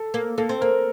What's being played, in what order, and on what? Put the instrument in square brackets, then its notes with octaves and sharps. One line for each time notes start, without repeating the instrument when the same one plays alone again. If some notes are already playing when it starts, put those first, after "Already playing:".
Already playing: [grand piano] A4
[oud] A#3
[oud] A#3 [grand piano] A4
[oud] C4
[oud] A#3 [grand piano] A#4